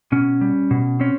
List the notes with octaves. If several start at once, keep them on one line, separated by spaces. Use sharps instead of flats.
B2 C#4
G3
B2
C4 C#4